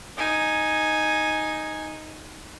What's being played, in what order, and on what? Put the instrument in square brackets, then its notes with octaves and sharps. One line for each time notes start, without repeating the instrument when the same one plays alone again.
[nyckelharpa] D#4 G#5